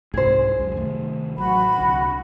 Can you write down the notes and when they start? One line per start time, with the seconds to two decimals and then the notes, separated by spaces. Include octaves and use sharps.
0.14 C2 G#2 C3 G#4 C5
0.59 C#2 F#2
0.76 C3 D#3 A3
1.38 A1 F#3 F#4 B5
1.76 C2 D3